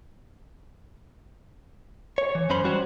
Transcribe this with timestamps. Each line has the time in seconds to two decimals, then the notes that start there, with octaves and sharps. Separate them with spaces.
2.18 C#5
2.35 E3
2.50 F#2 C#4 C5 B5
2.64 G3 C#4 F#4 C5 C#5